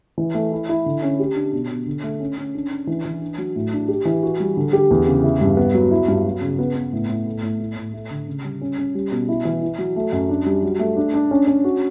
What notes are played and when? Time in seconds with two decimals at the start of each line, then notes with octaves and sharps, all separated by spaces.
0.18 E3
0.34 A3
0.52 E4
0.69 E4
0.86 D3
1.02 C#4
1.20 G4
1.36 D4
1.52 B2
1.70 B2
1.86 D3
2.03 A3
2.20 C#4
2.38 C#4
2.55 D4
2.72 D4
2.87 E3
3.05 E3
3.22 D4
3.38 F#3
3.56 A2
3.73 D4
3.88 G4
4.05 E3
4.23 F#4
4.40 G3
4.57 D3
4.73 G4
4.91 E2
5.07 C#3
5.23 E4
5.41 G2
5.57 B3
5.74 F#3
5.91 E4
6.08 G2
6.25 F#3
6.41 C#3
6.59 B3
6.75 B3
6.93 A2
7.09 A2
7.27 A3
7.43 A2
7.60 A2
7.76 A2
7.94 A3
8.11 D3
8.28 C#3
8.44 G3
8.61 C#4
8.78 C#4
8.95 G3
9.11 B2
9.28 E4
9.45 E3
9.63 E4
9.78 F#3
9.96 A3
10.13 F#2
10.29 D4
10.46 G3
10.63 F#3
10.79 A3
10.97 D4
11.14 D4
11.31 C#4
11.47 C#4
11.64 F#4